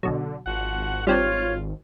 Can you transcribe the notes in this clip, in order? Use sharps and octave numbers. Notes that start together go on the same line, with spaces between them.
B1 B2 D3 F#3
G#1 F3 F#4 F#5
G3 C4 D4 F4 C#5